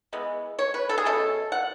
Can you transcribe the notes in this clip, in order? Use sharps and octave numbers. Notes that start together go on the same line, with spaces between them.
E3 G#3 B3
C#5
B4
A4
G#4
B2 A3 C#4 A4
F#5